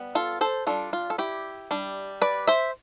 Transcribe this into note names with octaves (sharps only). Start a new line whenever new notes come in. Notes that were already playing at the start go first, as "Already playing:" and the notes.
Already playing: G3 B3
F4 A4
A4 C5
G3 D4 F4 A4
F4
A4
E4 G4
G3 D4
B4 D5
C5 E5